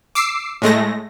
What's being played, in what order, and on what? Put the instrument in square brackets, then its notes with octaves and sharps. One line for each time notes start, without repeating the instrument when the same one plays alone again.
[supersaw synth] D6 E6 C7
A2 G#3 A3 A#6